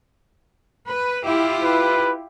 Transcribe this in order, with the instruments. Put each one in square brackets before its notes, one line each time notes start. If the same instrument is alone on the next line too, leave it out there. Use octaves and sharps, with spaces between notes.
[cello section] B4
E4 F4 G4
[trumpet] B4